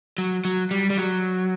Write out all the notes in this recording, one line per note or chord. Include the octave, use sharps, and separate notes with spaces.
F#3
F#3
G3
G3
F#3